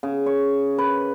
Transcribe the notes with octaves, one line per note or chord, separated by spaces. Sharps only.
C#3
C#5
B4